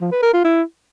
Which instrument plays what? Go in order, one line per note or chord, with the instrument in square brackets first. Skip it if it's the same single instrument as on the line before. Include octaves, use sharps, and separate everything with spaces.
[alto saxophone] F3
B4
A#4
F4
E4